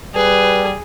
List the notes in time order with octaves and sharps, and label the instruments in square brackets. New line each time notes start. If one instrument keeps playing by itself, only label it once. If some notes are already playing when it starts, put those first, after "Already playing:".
[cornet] G3 [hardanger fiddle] G#4 [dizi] B4